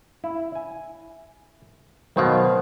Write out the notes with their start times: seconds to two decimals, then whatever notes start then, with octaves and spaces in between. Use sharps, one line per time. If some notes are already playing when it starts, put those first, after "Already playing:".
0.24 E4
0.55 G#5
2.16 B2 D#3 F#3 C5 F5